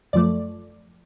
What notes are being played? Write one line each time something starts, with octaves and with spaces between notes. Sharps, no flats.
F#2 F3 A3 D5